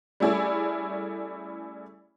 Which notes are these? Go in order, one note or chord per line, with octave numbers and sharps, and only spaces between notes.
G3 A3 C#4 E4 G#4 D5